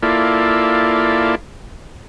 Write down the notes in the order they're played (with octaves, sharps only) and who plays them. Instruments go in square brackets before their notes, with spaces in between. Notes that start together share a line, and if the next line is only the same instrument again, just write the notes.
[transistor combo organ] A#3 E4 F4 A4 D5